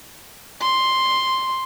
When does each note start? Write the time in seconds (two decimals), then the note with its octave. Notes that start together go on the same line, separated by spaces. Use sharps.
0.61 C6